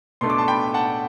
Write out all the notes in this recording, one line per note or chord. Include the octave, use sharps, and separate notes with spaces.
B2 A3 D4 C6
D6
A5 C6
G5 B5
F#5 A5